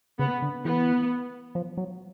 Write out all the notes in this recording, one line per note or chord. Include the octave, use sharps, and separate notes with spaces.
C#3 B3
D3
E3 B3
F3
F#3